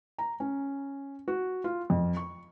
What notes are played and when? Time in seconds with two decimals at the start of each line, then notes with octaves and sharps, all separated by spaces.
0.18 A#5
0.40 C#4
1.28 F#4
1.64 F4
1.90 F2
2.17 C#6